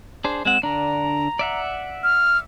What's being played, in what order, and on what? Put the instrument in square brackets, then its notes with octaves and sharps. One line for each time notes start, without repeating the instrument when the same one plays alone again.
[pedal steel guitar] D4 G#4 C5
[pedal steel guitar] G#3 C4 F#5 [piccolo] E7
[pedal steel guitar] D3 D4 [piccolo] A#5
[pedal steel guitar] D5 E5 F#5
[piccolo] F6